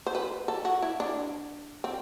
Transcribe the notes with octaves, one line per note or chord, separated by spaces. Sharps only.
C5
B4
A4
F#4
E4
D4
C4